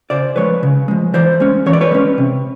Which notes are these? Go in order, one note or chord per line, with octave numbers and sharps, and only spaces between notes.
C#3 C5 D5
F3 G#3 B4 C#5
C#3
F3 G#3
E3 C5 D5
G#3 C#4
E3 C#5
D5
B4 C#5
G#3 C#4
C3